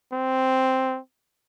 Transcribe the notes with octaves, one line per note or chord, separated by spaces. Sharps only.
C4